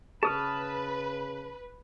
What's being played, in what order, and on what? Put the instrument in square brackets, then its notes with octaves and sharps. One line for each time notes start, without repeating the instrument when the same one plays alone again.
[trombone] C#3 [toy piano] G#4 [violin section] B4 [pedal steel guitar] A5 D#6 F6